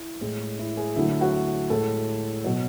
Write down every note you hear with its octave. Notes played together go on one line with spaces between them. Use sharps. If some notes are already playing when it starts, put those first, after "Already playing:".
Already playing: E4
A2 G#3
E4
G#4
D2 D3 F#3 A3 E4
E4
F#4
A2 G#3 A4
B2 F#3